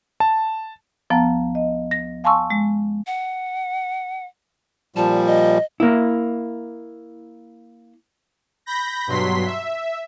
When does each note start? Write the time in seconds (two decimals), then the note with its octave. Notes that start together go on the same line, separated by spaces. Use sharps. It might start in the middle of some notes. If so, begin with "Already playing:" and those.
0.20 A5
1.10 D2 F3 B3 A5 A#5
1.55 D#5
1.91 A#6
2.24 F5 G#5 A5 C6 C#6 E6
2.50 G#3
3.07 F#5
4.96 A#2 F3 G3 A5
5.26 D#5
5.80 A#3 E4
8.66 B5 G6 A#6
9.07 G2 B2 F#3 C6 B6
9.46 E5